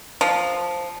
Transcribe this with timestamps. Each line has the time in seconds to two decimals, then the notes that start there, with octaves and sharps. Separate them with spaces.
0.21 F3